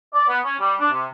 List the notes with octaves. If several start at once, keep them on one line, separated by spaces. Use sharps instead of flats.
D5
B3
C#4
G3
D4
C3